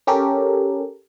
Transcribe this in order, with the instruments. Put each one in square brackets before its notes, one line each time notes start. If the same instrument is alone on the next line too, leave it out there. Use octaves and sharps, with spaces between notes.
[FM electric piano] C#4 G4 A4 A#4